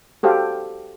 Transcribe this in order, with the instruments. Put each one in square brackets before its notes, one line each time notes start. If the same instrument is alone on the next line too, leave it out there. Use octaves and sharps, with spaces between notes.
[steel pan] F#4 G4 A4 C5 F5